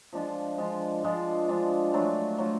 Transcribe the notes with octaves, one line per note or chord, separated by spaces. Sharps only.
F3 G#3 D4 F4
F3 G#3 D4 F4
F3 G#3 D4 F4
F3 G#3 D4 F4
F#3 A3 D4 F4
F#3 A3 D4 F4